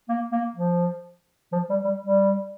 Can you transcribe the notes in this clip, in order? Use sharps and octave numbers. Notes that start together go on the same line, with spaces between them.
A#3
A#3
F3
F3
G3
G3
G3